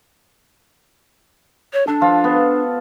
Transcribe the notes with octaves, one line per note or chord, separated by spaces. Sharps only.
C#5
D4 A4
F3 F4
B3